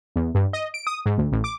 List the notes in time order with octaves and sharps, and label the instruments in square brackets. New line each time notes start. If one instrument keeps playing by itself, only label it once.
[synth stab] E2
G2
D#5
D7
D#6
G#2
D2
A1
D6